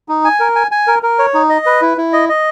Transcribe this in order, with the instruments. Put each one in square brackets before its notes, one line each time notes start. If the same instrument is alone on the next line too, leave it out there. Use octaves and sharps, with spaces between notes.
[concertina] D#4
G#5
A#4
G#5
G#5
A#4
A#4
C#5
D#4
D#5
B4
E4
E4
D#5
D#5